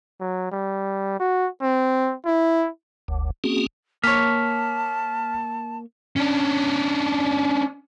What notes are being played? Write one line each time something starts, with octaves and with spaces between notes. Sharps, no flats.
F#3
G3
F#4
C4
E4
F#1 D2
A#3 C4 C#4 F#4 G#4
A#3 C#5 A5 F6 B6
C#4 D4